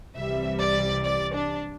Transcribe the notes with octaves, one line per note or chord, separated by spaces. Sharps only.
C2 C3 E3 G3 E5
D5
D5
D4